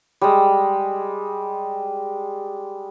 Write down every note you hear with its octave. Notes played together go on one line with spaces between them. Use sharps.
G3 G#3